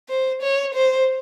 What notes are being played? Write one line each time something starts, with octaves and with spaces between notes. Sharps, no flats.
C5
C#5
C5